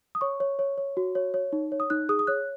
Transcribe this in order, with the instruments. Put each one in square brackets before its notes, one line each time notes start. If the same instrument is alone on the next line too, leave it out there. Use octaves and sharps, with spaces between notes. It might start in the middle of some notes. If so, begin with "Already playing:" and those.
[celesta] D#6
C#5 C#6
C#5
C#5
C#5
F#4
C#5
C#5
D#4
C#5
D#6
D#4 F#6
G#4 D#6
D#6
C#5 F#6